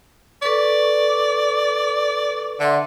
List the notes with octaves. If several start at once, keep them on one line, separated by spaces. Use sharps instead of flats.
A4 B4 D5 C#6
D3 E5 F#5 C6